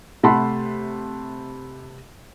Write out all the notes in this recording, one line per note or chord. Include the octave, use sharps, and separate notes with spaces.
C3 A3 F#5 A5 B5 C6